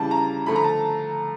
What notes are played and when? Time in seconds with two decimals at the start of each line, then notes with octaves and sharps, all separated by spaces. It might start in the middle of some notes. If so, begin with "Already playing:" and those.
Already playing: C#3 E3 G3 A5
0.11 A#5
0.46 D3 F3 A3 B5
0.56 A#5
0.64 A5